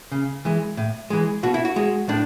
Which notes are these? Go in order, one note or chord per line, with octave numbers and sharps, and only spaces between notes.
C#3
E3 G#3
A2
E3 G#3
B2 F#4
E4
F#4
G#3
A2 D4